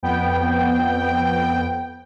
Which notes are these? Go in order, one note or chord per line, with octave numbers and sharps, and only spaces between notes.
F2 B3 G5